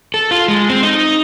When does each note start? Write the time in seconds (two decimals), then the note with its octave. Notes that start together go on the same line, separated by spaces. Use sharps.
0.14 A4
0.31 F4
0.48 G#3
0.69 C4
0.83 D#4